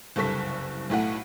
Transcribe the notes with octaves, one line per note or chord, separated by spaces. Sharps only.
F#1 C2 G2 A4 C#6 B6
B1 A2 A3 F#5